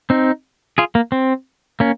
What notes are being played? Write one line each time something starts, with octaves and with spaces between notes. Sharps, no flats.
C4 D#4
F4 G#4
A#3
C4
A#3 C#4